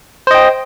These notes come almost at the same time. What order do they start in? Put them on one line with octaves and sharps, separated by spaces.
C5 D#5 G5